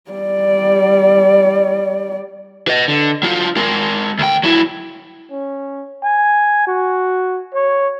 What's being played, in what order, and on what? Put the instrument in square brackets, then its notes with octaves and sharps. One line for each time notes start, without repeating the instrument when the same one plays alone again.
[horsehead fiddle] G3 D5
[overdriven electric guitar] B4 D#5
D3
F#3 F4
G#3 A#4
D2 G5
F#3 E4
[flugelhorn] C#4
G#5
F#4
C#5